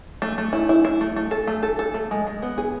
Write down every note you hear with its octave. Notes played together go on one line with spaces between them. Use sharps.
A3
A3
E4
E4
E4
A3
A3
A4
A3
A4
A4
A3
G#3
G#3
B3
G#4